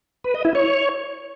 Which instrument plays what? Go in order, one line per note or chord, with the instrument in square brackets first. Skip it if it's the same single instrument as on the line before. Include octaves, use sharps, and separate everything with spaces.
[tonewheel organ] B4
D#5
E4
C#5